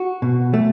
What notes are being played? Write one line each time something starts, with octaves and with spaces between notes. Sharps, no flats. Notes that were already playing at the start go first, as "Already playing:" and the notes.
Already playing: F#4
B2
A3